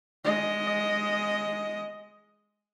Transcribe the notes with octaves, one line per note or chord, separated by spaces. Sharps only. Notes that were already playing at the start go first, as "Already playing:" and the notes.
G#3 D#5